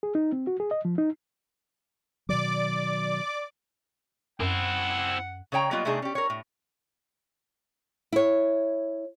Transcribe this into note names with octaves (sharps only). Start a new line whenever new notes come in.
G#4
D#4
C4
F#4
G#4
D#5
F3
D#4
B2 D#3 F#3 D5 D6
F#2 C4 E4 F#5
C#3 G#4 C#5 G5 A#5
F#3 G3 A#3 B3 F4 D#5
C3 A3 C4 D4 D#4 G#4
C#4 G4
A#4 C#5
A2
E4 C#5